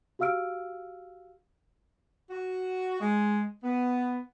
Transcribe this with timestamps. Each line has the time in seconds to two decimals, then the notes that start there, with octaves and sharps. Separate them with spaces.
0.19 F#4 G4 F5 E6 F6 D7
2.30 F#4
3.00 G#3
3.64 B3